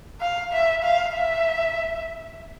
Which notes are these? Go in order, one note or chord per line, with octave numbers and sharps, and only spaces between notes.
F5
E5
F5
E5